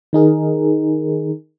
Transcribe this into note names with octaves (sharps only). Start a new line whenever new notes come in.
D#3 D#4 G#4 A#4